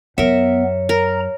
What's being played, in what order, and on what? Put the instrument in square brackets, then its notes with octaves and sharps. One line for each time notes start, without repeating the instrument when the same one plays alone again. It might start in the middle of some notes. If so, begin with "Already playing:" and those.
[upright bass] F#2 [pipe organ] B3 [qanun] A#4 E5 [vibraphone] C#5
[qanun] A#4 [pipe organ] A#5